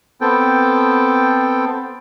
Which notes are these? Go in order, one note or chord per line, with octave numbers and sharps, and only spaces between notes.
B3 C4 A4 G5